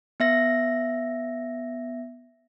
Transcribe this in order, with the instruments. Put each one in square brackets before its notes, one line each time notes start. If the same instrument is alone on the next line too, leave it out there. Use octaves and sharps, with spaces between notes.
[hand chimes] B3 E5 A#6